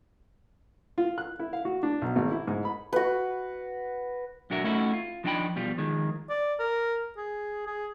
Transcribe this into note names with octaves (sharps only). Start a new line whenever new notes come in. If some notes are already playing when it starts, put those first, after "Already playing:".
F4
F#6
E4
F5
F#4
D4
B1
G#1
E4
G#2
B5
F#4 B4
B1 D4 F#4 A#4 C#5 E5
A3 C#4 D#4 E4 F#4
F4
F3 D4 D#4 F#4 G5 B5
B2 F3 G3 F4
D#3 F3 G#3
D5
A#4
G#4
G#4